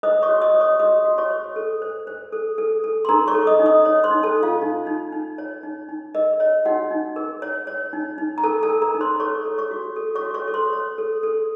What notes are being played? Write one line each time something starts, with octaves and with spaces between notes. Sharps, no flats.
C5 D#5 D#6
C#5 C#6
F#4
D#5 D#6
C5
C#5 C#6
F#4 D#5 D#6
F#4
C#5 C#6
C5
A4
C5
C5
A4
A4
A4
C6
D#4 A#4 A#5
C#5 C#6
A4
D#5 D#6
D#4
D#5 D#6
C#5
C5 C6
D#4
A4 A5
A4
F4 F5
D#4
D#4
D#4
C#5
D#4
D#4
A#4 D#5
C#5 D#5
D#4 F#4 F#5
D#4
A#4
C#5
C#5
D#4
D#4
A#5
A4 A#4 A5
A4 A5
A#4
A#4 A#5
D#4
C5 C6
A4 C#5 C#6
A4
C#5 C#6
F#4
A4
C#5 C#6
F#4
C#5 C#6
A4
C5 C6
C#5
A4
A4